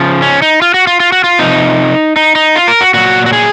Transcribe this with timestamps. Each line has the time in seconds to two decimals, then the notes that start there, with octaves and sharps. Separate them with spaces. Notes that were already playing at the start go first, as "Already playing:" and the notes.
Already playing: C#3 F3
0.22 C#4
0.42 D#4
0.62 F4
0.74 F#4
0.87 F4
1.00 F4
1.12 F#4
1.24 F4
1.39 C3 F3 D#4
2.16 D#4
2.35 D#4
2.56 F4
2.68 A#4
2.81 F#4
2.94 A#2 F#3 F#4
3.26 F#4
3.33 G#4